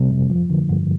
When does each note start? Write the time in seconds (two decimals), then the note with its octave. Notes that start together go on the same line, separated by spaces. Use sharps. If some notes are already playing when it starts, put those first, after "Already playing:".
Already playing: C3 G3
0.11 F2
0.30 F3
0.50 D3
0.69 G2